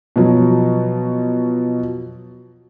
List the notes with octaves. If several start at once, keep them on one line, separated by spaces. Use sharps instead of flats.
B2 F3 F#3